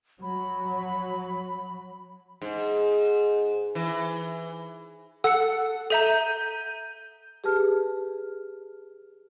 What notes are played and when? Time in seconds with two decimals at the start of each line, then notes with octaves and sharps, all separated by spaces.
0.22 F#3 B5
2.42 G#2
3.75 E3
5.24 A4 F#5 E6 C#7
5.90 A4 E5 A#5 G6 D#7
7.44 G4 G#4 B4 A5 F6